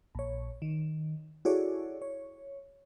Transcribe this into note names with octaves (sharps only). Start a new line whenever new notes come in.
A#1 C#5
D#3
E4 F#4 G#4 A4 C#5 D5
C#5